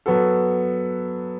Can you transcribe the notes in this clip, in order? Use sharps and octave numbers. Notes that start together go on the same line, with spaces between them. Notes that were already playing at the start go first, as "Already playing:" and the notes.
F#3 B3 F#4 A4